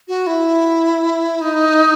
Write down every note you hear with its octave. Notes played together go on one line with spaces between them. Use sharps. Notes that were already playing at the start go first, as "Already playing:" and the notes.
F#4
E4
D#4